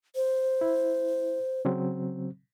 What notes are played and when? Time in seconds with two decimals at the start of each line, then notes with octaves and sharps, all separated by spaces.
0.15 C5
0.61 E4
1.65 C#3 F#3 C4